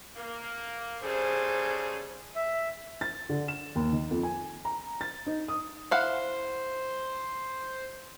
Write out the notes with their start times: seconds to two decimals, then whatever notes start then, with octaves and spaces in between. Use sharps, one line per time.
0.15 A#3
1.02 C#3 G3 G#4 A4 C5
2.36 E5
3.01 A6
3.29 D3
3.48 E7
3.75 D#2
3.92 D#3
4.11 F2
4.23 G#5
4.65 A#5
5.01 A6
5.26 D#4
5.48 D#6
5.91 E4 C5 F5 F#5